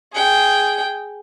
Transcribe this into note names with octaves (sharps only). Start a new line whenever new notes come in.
G#4 G5